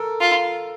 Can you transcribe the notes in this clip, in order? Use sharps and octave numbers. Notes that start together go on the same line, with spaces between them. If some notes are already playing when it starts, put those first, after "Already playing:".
Already playing: A4 A#4
F4